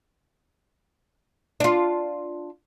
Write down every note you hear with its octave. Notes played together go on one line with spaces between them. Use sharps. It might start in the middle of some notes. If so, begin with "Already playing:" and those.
D4 F4